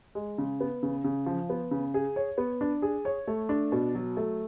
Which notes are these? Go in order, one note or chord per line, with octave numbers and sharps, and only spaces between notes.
G#3
C#3
B3
C#3
C#3
F3
B3
C#3
G#4
C#5
B3
D4
G#4
C#5
A3
D4
B2
F#3
A3